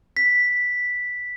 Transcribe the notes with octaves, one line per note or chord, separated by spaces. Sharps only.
B6